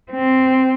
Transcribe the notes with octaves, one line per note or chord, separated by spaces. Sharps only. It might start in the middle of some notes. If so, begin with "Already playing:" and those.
C4